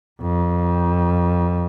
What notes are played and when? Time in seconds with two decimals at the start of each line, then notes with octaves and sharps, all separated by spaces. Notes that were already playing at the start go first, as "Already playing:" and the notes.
0.21 F2